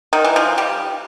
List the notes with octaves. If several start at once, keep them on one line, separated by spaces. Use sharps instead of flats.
D#3
E3
F3
G3